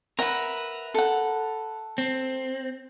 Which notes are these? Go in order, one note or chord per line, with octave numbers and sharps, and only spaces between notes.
A#4 B4 E5 F#5
A4 F#5
C4